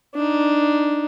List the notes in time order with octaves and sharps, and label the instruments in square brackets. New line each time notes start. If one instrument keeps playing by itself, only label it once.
[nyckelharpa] D4 D#4